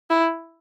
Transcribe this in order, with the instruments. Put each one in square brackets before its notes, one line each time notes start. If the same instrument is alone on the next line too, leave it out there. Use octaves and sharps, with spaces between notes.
[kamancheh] E4